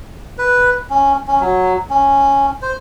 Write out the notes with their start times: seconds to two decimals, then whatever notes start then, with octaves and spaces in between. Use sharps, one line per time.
0.38 B4
0.90 C#4
1.28 C#4
1.40 F#3
1.90 C#4
2.62 C5